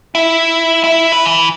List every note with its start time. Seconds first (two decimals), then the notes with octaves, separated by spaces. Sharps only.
0.15 E4
0.84 E4
1.12 B4
1.25 E3